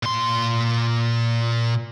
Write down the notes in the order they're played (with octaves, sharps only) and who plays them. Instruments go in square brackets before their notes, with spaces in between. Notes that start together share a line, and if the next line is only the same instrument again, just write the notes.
[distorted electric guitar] A#2 C6